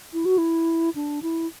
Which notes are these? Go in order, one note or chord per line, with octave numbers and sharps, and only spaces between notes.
E4
F#4
E4
D4
E4